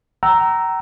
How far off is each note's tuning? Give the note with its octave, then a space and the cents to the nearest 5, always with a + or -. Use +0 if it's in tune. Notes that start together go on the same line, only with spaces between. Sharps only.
G5 -45 A#5 +0 E6 +0